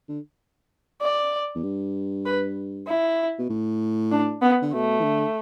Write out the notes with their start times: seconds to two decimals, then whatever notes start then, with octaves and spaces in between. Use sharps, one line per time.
0.09 D3
1.01 D5
1.55 E2
1.63 G2
2.26 B4
2.87 E4
3.38 B2
3.49 A2
4.12 D4
4.42 B3
4.62 D3
4.73 B2 A3
5.00 E3
5.04 D3